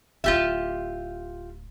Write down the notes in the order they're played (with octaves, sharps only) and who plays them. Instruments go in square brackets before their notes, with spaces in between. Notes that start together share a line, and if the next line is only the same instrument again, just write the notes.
[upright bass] D1 E4 [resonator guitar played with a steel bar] F4 G4 E5